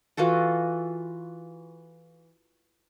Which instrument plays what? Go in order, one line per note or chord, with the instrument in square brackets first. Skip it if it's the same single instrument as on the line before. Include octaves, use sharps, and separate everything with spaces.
[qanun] E3 F4 F#4 A4